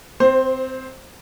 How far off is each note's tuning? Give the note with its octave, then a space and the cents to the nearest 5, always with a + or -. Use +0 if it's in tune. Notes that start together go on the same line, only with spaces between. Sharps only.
C4 -15 C5 +10